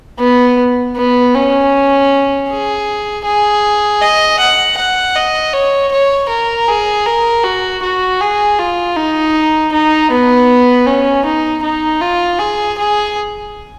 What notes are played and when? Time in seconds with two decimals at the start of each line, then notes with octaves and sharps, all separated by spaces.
0.19 B3
0.97 B3
1.35 C#4
2.49 G#4
3.24 G#4
4.02 D#5
4.39 F#5
4.77 F#5
5.16 D#5
5.53 C#5
5.91 C#5
6.29 A#4
6.68 G#4
7.06 A#4
7.44 F#4
7.82 F#4
8.21 G#4
8.59 F4
8.96 D#4
9.72 D#4
10.11 B3
10.87 C#4
11.25 D#4
11.63 D#4
12.01 F4
12.39 G#4
12.78 G#4